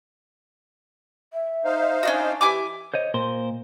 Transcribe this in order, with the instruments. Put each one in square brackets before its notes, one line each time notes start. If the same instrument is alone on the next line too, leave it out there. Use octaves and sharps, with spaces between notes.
[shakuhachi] E5
[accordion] D#4 C5 F5
[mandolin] C#4 D4 F#4
[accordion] E3 [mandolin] E4 G#5 D6 [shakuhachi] G4
[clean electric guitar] C5 C#5 D#5
A#2 A#4 C5 C6